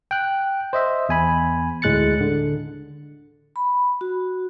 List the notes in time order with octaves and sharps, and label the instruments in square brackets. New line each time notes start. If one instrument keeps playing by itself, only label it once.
[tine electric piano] G5 F#6
C5 D#5 E5
E2 G#5 B5
D2 A2 G#3 F#6 A6 C#7
D3
[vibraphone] B5
F#4